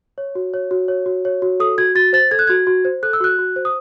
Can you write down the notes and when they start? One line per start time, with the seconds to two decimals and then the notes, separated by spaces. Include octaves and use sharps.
0.18 C#5
0.35 F#4
0.54 C#5
0.71 F#4
0.88 C#5
1.06 F#4
1.25 C#5
1.42 F#4
1.60 A4 D#6
1.78 F#4 G#6
1.95 F#4 A6
2.13 C5 A6
2.31 A4 G#6
2.39 F#6
2.47 F#4 G#6
2.67 F#4
2.85 C5
3.03 A4 F#6
3.13 E6
3.21 F#4 F#6
3.39 F#4
3.56 C5
3.65 D#6